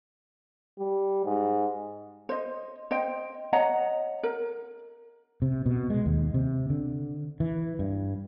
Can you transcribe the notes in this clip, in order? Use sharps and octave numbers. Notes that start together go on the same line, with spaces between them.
G3
G#2
C5 D#5
C5 D#5 G5
C#5 D#5 F#5 A#5
A#4
C3
B2
G#3
D#2
C3
D3
E3
G2